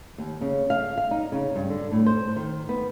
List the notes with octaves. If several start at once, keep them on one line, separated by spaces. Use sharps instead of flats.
D#2
C#3
F5
F5
D#4
C#3
G2
D3
A2
C5
D#3
B3